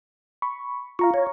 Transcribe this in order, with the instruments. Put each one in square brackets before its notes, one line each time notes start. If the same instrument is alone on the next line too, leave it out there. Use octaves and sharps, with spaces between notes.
[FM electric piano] B5 C#6
[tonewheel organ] F4 [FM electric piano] F5 A#5 C#6
[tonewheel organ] C#5